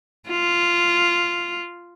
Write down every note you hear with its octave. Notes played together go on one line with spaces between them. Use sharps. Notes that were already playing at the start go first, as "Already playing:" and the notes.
F4